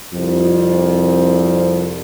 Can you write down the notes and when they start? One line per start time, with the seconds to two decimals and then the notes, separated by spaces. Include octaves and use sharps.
0.12 C2 F2